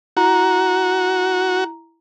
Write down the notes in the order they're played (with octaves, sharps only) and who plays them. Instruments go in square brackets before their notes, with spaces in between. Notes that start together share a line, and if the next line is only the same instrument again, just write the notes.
[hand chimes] E4 A#5 [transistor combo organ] F#4